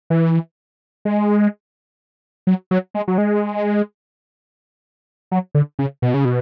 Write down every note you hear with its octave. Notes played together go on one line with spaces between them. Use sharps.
E3
G#3
F#3
F#3
G#3
F#3
G#3
F#3
D3
C#3
B2
C#3
B2